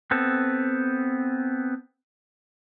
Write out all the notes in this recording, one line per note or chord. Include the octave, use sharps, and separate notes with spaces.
B3 C4 A4